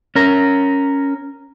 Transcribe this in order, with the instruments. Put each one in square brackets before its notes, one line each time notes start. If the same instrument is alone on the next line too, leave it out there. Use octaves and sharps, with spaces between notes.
[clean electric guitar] C#4 A#4